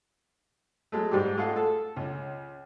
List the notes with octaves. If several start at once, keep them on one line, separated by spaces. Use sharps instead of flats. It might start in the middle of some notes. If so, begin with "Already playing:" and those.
F#3 G#3 A3
G#2 G3 G#3 G4
G#3 A3 F4 G#4 F5 F#5
A4
C#2